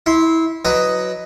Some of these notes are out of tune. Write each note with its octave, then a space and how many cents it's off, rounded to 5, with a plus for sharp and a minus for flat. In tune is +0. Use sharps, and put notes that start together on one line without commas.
E4 -20 C6 +0
F#3 +0 B4 +10 D#5 +0